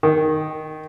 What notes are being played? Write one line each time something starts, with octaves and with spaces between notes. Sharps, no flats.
D#3